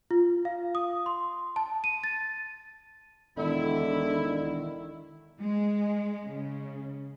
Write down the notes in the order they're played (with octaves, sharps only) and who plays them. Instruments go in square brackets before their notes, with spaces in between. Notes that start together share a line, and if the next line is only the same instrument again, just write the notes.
[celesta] F4
F5
D#6
C6
A5
D#7
A6
[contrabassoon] E1 [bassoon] D3 [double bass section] D#3 [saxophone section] E4
[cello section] G#3
C#3